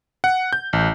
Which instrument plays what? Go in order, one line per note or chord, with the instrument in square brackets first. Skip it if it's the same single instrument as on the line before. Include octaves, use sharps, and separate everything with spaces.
[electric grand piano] F#5
G6
A1